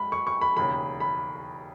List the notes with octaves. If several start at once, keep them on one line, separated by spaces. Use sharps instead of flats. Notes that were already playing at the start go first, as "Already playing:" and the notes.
Already playing: G#2 B5
C#6
C#6
B5
E1 D#2 C#3 B5
B5